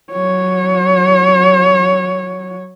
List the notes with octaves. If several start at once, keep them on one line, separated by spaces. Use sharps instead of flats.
F#3 C#5